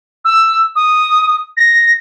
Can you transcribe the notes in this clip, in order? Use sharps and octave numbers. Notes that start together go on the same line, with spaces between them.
E6
D#6
A#6